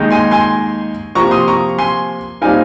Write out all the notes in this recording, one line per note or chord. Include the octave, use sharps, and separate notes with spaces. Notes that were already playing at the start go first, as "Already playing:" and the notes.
Already playing: D#2 D#3 G#3 D#4
G#5 C6
G#5 C6
C3 F3 A#3 A#5 C#6
C6 D#6
A#5 C#6
G#5 C6
A#2 G3 C4 D#4 F5 G#5